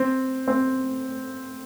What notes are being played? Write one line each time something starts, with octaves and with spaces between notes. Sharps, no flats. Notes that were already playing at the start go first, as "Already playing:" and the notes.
Already playing: C4
C4